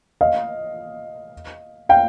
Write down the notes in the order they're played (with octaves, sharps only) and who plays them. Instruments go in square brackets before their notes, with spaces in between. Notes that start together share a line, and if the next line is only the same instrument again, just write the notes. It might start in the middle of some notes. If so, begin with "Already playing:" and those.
[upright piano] D#5 F5
F5 G5